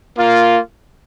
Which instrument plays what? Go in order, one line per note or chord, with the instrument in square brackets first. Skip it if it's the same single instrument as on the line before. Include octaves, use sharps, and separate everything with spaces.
[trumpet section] A#3 F4